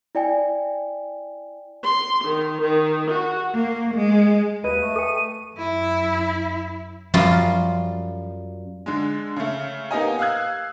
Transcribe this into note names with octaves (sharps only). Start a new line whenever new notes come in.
E4 D5 G5 G#5
C6
D#3
D#3
F#4
A#3
G#3
D#2 B4 D#5 D#7
A3
A4 G5
F#2 E4
F#2 F3 G3 F4
D3 G#3
C#3 A3
A#3 B3 D#4 G4 D#5 G#5
F5 D#6 E6 F#6 G#6